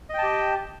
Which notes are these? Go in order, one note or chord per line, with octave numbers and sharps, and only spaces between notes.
G4 D#5 G5 A5